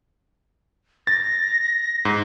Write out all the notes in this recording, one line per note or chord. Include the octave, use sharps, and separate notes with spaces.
A6 A#6
G#2